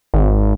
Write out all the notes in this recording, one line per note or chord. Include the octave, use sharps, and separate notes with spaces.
G#1